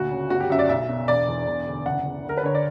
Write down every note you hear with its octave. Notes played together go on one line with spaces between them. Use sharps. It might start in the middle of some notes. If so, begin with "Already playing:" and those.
Already playing: D2 A#2 F#4
C#3
G1 F#4
G4
F#2 E5
D5
B1 E5
B2
E1 D5
E2
E1
D2
F#1 F#5
E2
D2 A#4
B4
D3 C#5
D5